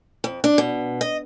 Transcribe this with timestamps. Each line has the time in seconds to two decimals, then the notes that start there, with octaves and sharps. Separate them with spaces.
0.24 F2
0.44 D4
0.58 B2
1.01 D#5